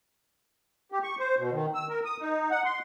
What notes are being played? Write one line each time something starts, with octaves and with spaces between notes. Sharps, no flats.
G4
C#6
C5
B2
D#3
E6
A#4
D#6
D#4
F#5
C6